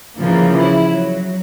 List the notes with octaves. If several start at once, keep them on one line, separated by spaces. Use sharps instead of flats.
C#3 E3 F3 A#3
E4
F#3